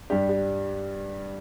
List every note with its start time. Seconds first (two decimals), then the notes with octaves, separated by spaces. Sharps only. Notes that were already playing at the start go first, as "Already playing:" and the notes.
0.10 G2 G3 D4 G4
0.29 G4